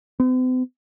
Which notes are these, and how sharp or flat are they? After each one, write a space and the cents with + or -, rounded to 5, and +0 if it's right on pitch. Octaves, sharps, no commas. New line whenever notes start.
C4 -45